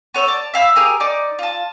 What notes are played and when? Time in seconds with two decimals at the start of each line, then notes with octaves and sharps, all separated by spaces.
0.14 B3 C#5 E6 G6
0.27 D5 A5
0.54 E5 F5 G5 B5
0.76 G4 G#4 A#4
1.00 D#4 D5
1.39 F4 A5